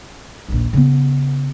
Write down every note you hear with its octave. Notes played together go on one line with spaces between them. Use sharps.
A#1 D#2
C#3 B3